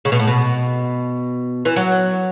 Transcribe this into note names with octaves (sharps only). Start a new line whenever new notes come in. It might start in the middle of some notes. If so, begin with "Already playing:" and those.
C#3
B2
A2
B2
E3
F#3